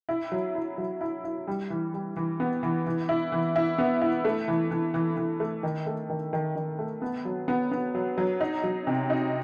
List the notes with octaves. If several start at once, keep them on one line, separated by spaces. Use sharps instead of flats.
E4
F#3
E4
F#3
E4
E4
G3
E3
G3
E3
B3
E3
E3
E4
E3
E4
B3
E4
A3
E3
E3
E3
E3
A3
D#3
A3
D#3
D#3
D#3
A3
B3
F#3
B3
B3
F#3
F#3
D#4
F#3
C3
D#4